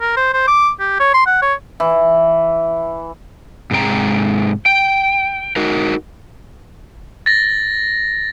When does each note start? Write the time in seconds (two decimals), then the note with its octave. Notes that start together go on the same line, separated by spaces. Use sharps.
0.01 A#4
0.17 C5
0.33 C5
0.48 D6
0.80 G4
1.00 C#5
1.14 C6
1.26 F#5
1.42 C#5
1.80 E3
3.71 G#2 C3 G#3 G5 A#5
4.66 G5
5.56 D#4 F#4 A#4
7.26 A6 A#6